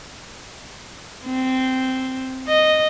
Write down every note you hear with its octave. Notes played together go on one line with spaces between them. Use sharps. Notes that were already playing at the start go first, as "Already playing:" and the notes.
C4
D#5